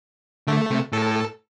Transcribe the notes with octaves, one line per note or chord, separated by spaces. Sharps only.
D3 A3
C3
A2 A4